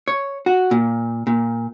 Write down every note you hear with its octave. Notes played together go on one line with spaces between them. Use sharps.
C#5
F#4
A#2
A#2